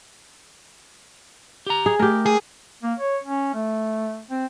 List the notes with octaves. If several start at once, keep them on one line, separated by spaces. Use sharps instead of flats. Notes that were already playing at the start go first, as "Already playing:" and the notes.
G4 A#5
G#4
A3 G4 A#4
G#4
A#3
C#5
C#4
A3
C4